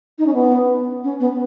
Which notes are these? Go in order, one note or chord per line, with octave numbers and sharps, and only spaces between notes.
D#4
C#4
B3
C#4
B3